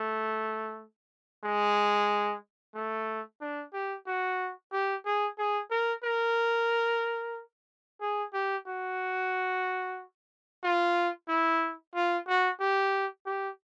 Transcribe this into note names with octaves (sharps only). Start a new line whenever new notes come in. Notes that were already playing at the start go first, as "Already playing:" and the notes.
Already playing: A3
G#3
A3
D4
G4
F#4
G4
G#4
G#4
A#4
A#4
G#4
G4
F#4
F4
E4
F4
F#4
G4
G4